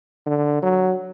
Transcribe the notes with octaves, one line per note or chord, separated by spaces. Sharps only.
D3
F#3